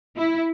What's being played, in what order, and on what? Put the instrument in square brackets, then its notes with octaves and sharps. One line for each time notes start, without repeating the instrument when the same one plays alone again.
[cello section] E4